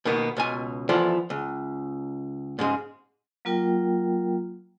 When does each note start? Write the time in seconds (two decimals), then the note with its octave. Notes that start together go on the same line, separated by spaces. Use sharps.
0.05 B2 D#3 A#3 B3
0.37 C#2 B2 G#5
0.89 E3 F3 B3 E4 A4 D5
1.30 C#2
2.59 G#2 C#3 G#3
3.45 F#3 A#3 F4 A#4 G5